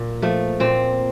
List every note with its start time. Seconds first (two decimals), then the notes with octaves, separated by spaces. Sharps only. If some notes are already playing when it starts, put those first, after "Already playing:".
Already playing: A#2
0.22 F3 A3
0.60 A#2 C4